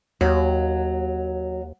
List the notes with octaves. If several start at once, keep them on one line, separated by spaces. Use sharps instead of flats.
D#2 F#3